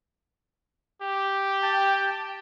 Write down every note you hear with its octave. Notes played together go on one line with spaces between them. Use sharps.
G4
G5 A5